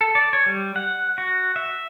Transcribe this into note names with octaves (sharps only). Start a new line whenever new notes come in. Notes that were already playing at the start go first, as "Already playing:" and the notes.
A4
D5
C#5
G3
F#5
F#4
E5